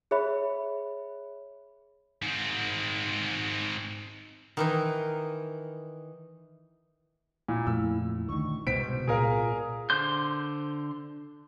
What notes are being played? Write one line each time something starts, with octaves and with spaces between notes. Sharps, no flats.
G#4 C#5 E5 B5
G#2 C4
D#3 E3 D#4
A#2 E4
F2 A#2 A3 E6
D2 D#3 C#6
C2 G#2 B2 C5 B6 D7
A#2 G#4 A#4 F5
D3 C5 C6 G6